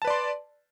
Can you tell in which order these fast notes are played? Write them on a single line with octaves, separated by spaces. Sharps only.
A5 B4 D5 C6